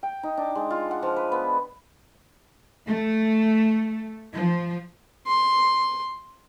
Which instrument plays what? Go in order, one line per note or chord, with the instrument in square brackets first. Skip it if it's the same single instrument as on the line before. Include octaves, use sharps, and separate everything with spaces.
[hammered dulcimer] G5
D#4
D4
G#3
F4
F#5
F3
B4
B3
[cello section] A3
F3
[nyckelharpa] C6